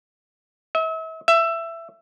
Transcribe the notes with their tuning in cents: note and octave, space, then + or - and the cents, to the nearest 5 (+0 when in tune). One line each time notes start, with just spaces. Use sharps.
E5 -40
E5 +15